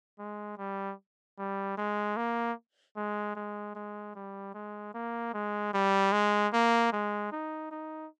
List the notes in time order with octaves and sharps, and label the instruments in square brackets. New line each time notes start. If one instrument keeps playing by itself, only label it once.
[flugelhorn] G#3
G3
G3
G#3
A#3
G#3
G#3
G#3
G3
G#3
A#3
G#3
G3
G#3
A#3
G#3
D#4
D#4